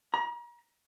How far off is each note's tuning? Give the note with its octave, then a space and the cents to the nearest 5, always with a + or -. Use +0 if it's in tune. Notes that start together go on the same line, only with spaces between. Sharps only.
A#5 +40